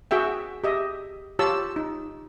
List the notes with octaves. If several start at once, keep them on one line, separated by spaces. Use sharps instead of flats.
F#4 G#4 E5 G5
G4 D#5 E5
F4 G4 C#5 A5 E6
D#4